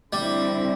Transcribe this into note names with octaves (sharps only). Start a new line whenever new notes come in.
D3 G3 C4 E4